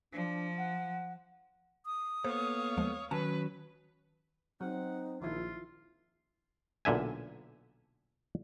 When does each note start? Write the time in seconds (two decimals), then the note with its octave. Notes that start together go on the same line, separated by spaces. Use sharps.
0.13 F3 D4
0.58 F#5
1.86 D#6
2.24 A#3 B3 A4 C5 C#5 F5
2.77 D#2 F3 G#3
3.11 D#3 F#3 C#4 B4 G#5 A5
4.61 F#3 C4 D#4 F#5
5.22 A#1 D#3 F3 E4 F4
6.85 B1 A#2 D3 E5 G#5